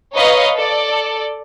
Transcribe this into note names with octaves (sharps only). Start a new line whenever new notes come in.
B4 C#5 D#5 F5 A#5 C#6
A4 D5